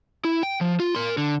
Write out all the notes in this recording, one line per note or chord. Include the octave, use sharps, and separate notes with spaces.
E4
G5
F3
F4
A#4 C6
D3